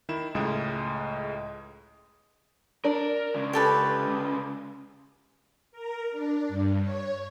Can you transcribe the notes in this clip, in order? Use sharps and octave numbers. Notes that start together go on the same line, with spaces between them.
D#3 E4 E7
C#2 A2 G#3 D#5 D#6
D4 A#4
C#2 C#3
G4 A4 B4
A#4
D4
G2
C#5